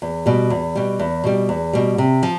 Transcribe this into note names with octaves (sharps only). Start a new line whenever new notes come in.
E2
B2 G3
E2
B2 G3
E2
B2 G3
E2
B2 G3
C3
F3